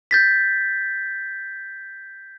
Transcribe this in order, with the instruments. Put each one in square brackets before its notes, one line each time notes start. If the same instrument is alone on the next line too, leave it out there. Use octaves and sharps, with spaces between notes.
[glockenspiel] G6 A6 B6